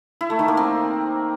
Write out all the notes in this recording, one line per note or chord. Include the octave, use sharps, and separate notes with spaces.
E4
A3
D#3
A#3
C4